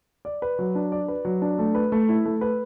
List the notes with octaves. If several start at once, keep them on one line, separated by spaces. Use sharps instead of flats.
D5
B4
F#3
D4
D5
B4
F#3
D4
A3
B4
A3
E4
A3
B4